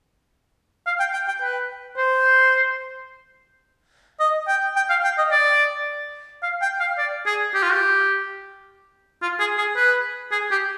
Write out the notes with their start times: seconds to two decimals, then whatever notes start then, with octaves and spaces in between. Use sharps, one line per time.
0.86 F5
1.00 G5
1.13 G5
1.28 G5
1.42 B4
1.97 C5
4.20 D#5
4.48 G5
4.76 G5
4.90 F5
5.04 G5
5.18 D#5
5.31 D5
6.43 F5
6.62 G5
6.80 F5
6.98 D5
7.26 G#4
7.54 G4
7.63 F4
7.72 G4
9.22 F4
9.40 G#4
9.58 G#4
9.76 B4
10.32 G#4
10.51 G4